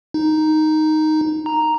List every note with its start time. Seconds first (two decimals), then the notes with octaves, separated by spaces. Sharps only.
0.14 D#4
1.46 A#5